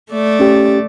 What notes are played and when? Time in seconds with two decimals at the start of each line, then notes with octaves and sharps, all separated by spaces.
0.11 A3 D5
0.40 C#4 G4